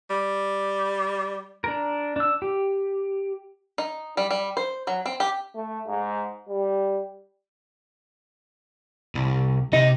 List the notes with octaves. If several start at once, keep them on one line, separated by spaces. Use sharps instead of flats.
G3
D4 A#4
D4 E6
G4
D#4
G3
G3
C5
F#3
C4
G4
A3
G#2
G3
C2
C3 D#4